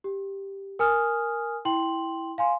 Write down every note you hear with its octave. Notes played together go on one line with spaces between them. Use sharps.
G4
A#4 G#5 D#6 F6
E4 G5 C6 F#7
F5 G#5 C6